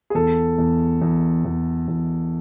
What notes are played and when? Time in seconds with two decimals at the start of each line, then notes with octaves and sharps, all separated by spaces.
0.10 G#4
0.15 E2 A4
0.58 E2
1.02 E2
1.45 E2
1.88 E2